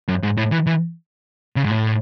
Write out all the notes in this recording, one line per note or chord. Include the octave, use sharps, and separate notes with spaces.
F#2
G#2
A2
E3
E3
C#3
G#2
A2